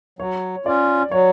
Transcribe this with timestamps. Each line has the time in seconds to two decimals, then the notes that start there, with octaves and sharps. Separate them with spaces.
0.19 F#3 C#5
0.65 C#4 F4 D5
1.11 F#3 C#5